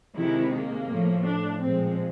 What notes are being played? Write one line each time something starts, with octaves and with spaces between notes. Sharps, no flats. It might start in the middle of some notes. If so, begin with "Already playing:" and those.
C3 D#3 G#3 E4
A#3
A2 F3 A3
D4
A#2 F3 G#3 C4